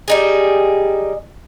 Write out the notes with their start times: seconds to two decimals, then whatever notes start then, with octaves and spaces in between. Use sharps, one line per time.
0.08 G3 D#4 G#4